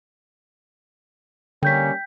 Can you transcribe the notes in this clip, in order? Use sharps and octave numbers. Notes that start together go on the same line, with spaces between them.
D3 G3 A#3 C#4 G5 G6 B6